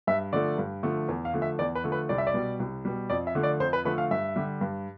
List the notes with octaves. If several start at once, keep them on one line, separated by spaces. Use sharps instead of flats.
G2 E5
D3 F3 A3 D5
G2
D3 F3 A3
E2
F5
D3 F3 A3
E5
E2 D5
B4
D3 F3 A3
B4
C2 D5
E5
D5
B2 G3
C2
B2 G3
F2 D5
E5
D3 F3 A3
D5
F2 C5
B4
D3 F3 A3 B4
F5
G2 E5
D3 G3
G2